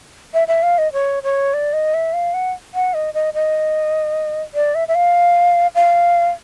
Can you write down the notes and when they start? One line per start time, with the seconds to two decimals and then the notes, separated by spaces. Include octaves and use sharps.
0.34 E5
0.48 E5
0.63 F5
0.78 D#5
0.93 C#5
1.23 C#5
1.54 D5
1.73 D#5
1.94 E5
2.13 F5
2.34 F#5
2.74 F#5
2.94 D#5
3.14 D#5
3.34 D#5
4.55 D5
4.75 E5
4.88 E5
4.95 F5
5.75 F5